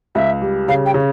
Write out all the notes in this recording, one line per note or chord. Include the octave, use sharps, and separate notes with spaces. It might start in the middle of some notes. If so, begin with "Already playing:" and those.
C#2 E5
G3
C#3 F5
G5
C#3